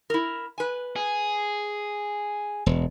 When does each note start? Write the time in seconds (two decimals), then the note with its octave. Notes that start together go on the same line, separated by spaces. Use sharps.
0.10 E4 A#4
0.58 B4 G#5
0.96 G#4
2.66 E1